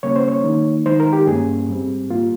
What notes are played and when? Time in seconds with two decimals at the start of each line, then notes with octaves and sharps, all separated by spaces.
0.03 C#3 G3 A#3 C#4 C#5
0.16 C5
0.28 C#5
0.44 D#3 A#3 D#4
0.85 D#3 G#3 D#4 C5
1.00 A#4
1.13 G4
1.27 G2 G3 A#3 C#4 G#4
1.69 G#2 G3 C4
2.10 G3 A#3 F4